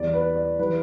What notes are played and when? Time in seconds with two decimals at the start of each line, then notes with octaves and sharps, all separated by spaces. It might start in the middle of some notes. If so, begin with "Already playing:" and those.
Already playing: E2 E3 G3 D5
0.14 B4
0.36 D5
0.59 E3 G3 B4